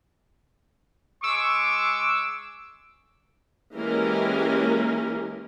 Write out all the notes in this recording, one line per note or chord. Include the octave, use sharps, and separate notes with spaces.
G#3 C#6 D6 E6
E3 G#3 A#3 C#4 G4 A#4